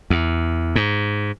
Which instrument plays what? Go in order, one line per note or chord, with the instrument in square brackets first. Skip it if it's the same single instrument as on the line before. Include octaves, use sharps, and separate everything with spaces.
[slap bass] E2
G#2